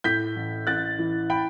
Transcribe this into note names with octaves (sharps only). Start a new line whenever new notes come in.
A2 G6 B6
A1
A1 F#6 A6
E3
G5 B5